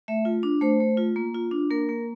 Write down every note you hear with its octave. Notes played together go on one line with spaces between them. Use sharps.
A3 E5
F4
D4
A3 C5
A3
F4
A#3
F4
D4
A#3 A#4
A#3